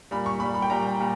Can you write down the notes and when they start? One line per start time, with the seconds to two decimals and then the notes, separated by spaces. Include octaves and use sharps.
0.11 A#2 G3 B5
0.26 C#6
0.40 A#2 G3 B5
0.54 B5
0.62 G5
0.70 A#2 G3 A#5
0.99 A#2 G3